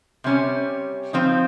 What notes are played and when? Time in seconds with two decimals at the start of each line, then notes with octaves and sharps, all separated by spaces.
0.24 C3 G3 C#4
1.13 F3 C4 D#4